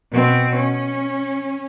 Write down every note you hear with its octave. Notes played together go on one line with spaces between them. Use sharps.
B2 C4
C#4